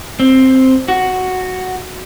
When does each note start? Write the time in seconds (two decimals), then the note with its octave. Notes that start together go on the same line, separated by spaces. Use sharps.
0.20 C4
0.88 F#4